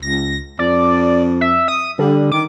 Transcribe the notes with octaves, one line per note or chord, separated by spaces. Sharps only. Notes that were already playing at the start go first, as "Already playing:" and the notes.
C#2 A#6
F2 D5
E5
D#6
D3 G3
D#3 D6